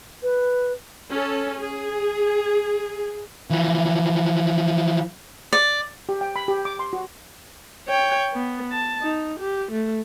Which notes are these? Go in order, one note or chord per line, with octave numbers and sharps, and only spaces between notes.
B4
C#4 A4
G#4
E3 F3
D5
G4
G5
B5
G4
D6
C6
F#4
C#5 G5
B3
A5
D#4
G4
A3